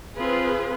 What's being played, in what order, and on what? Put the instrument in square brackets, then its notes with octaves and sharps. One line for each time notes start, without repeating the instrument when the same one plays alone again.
[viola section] C4 F4 G#4 B4